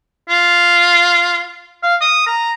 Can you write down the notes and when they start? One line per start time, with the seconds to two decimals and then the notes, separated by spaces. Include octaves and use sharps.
0.29 F4
1.83 F5
2.01 D#6
2.27 A#5